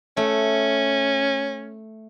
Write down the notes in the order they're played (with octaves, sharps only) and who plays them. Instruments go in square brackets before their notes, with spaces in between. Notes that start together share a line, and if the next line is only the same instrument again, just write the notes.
[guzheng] A3 [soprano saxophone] C#4